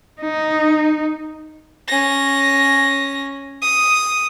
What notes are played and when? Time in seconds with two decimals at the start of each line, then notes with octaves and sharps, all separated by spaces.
0.21 D#4
1.88 C#4 A#6
3.62 D#6